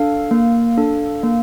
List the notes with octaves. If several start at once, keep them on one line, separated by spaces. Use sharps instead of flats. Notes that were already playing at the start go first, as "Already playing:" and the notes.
Already playing: D4 A4 F5
A#3
D4 A4
A#3